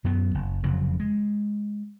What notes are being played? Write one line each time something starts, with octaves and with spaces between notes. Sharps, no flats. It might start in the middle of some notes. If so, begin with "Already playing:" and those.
F#2 F#3 B3
F#1
F1 F2 C#3 F#3
G#3